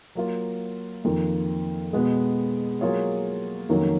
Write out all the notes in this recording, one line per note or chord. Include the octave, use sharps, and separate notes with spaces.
F#3 A#3 F4
F2 D#3 A#3 F4
B2 G#3 B3
F#3 A#3 F4 G#4 C#5
F2 D#3 F#3 A#3 C#4